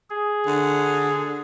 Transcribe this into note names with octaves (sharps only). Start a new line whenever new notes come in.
G#4
D3